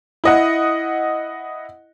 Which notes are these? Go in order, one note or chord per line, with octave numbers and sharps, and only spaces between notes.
E4 D#5 F#5